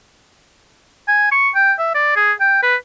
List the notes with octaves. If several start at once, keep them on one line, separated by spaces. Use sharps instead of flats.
G#5
C#6
G5
E5
D5
G#4
G5
B4